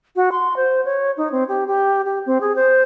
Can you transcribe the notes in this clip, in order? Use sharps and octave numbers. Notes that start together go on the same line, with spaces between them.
F#4
C6
C5
C#5
D#4
C4
G4
G4
G4
C4
G#4
C5